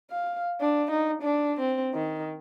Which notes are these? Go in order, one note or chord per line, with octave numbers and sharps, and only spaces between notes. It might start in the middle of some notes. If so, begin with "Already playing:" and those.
F5
D4
D#4
D4
C4
D#3